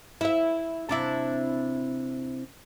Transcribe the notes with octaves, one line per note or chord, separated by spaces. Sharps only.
E4 E5
C3 D4 E4